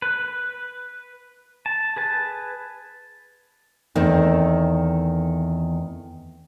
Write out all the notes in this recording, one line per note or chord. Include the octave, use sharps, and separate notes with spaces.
B4
A5
G#4 B4 A5
E2 D#3 A3 C4 D#4